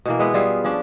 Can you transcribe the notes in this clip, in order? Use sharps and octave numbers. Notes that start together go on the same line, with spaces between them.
B2 E3 A#3
G#3 B3 E4
G3 F4 G#4 E5
F3 C#4 D4